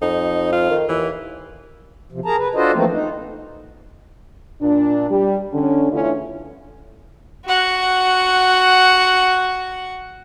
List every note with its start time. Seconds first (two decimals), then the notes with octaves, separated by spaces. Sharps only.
0.02 F2 D#4
0.52 F4
0.70 D#3
0.89 D#2 E3
2.12 C3 F3
2.25 G#4 A#4 A5 A#5
2.37 B4
2.55 D4 F4 F#4 A4 C5 D#5
2.73 E3 F3 A3 A#3 C4
2.91 D#4
4.61 A#2 D4
5.10 G3
5.52 D3 C#4
5.91 E2 D3 A3 C#4 E4 F4
7.46 F#4 F#5